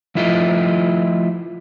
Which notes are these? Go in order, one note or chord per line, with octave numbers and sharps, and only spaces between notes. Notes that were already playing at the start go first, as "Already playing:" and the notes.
F3 A3 E4 F4 D#5